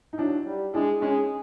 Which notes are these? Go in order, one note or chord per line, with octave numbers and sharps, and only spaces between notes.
D#4
F#3 D4 E4
G3
G#3 D4 E4
G#3 C#4 D#4